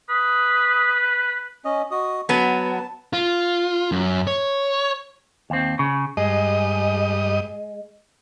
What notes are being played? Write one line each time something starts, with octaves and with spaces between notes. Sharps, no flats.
B4 D#6
C#4 D#5
F#4 D#5 D#6
F#3 B3 A5
F4
F#2
C#5
D#2 C4
C#3
G2 G#3 D#5